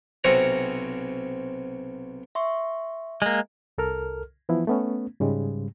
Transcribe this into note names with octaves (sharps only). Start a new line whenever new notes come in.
B1 C3 C4 C#4 F#4 A#5
E5 C6 C#6
G#3 A#3
C2 A4 A#4 F6
E3 F3 B3 E4
A3 B3 C#4
G#2 C#3 G3 G#3